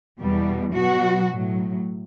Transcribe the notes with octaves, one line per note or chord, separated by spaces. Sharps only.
E2 B2 G3
B2 F#3 F#4
A2 F#3